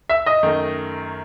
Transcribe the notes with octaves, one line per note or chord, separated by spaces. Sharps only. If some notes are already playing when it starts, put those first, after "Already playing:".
E5 E6
D#5 D#6
F#2 D#3 A3